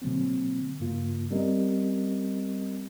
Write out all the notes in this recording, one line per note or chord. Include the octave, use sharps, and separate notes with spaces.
B2 D3 F#3 A#3 C4
G2 C#3 A#3 F4
G3 C4 C#4 G4 A#4 D#5